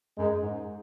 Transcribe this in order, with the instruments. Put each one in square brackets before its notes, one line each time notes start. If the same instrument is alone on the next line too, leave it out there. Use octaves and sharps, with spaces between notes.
[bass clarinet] F#2 [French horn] G#3
[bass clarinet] G#2